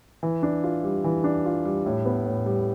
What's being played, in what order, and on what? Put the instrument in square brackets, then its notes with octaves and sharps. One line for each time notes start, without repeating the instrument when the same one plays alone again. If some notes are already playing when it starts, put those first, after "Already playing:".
[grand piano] E3
D4
F4
G3
E3
D4
F4
G3
A2
B3
A2
G3